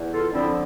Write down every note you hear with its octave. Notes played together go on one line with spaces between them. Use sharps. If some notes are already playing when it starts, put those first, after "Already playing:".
Already playing: E2
F4 A4
D3 F3 C4 E4